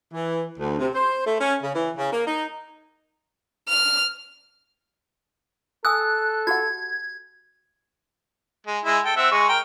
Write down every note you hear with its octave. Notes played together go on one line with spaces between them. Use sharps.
E3
D2
C3
C5
A3
C#4
C#3
E3
C#3
A#3
D#4
F6
A4 G#5 D#6 E6 F#6
F#4 G4 F#5 G#6
G#3
G#3 E4
A4 G5
C4 E5 F#5
G#3 C#6
A#4 G5